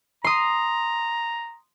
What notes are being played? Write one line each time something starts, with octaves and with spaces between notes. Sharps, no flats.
A#5 C6 D#6